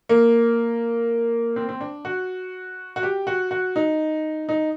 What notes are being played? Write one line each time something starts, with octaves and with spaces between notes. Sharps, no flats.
A#3
C4
C4
D4
F#4
F#4
G4
F#4
F#4
D#4
D#4